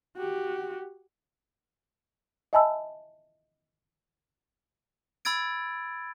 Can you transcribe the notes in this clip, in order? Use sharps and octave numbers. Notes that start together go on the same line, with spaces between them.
F#4 G4
D#5 E5 G#5 A5 B5 E6
B5 E6 G#6 A6 D7